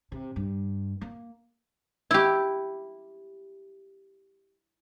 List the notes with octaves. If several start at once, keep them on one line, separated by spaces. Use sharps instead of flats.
C3
G2
A#3
E4 G4